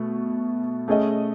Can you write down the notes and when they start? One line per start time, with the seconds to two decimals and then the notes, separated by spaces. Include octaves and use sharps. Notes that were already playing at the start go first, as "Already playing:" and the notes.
Already playing: B2 A3
0.88 A3 C#4 G#4 D#5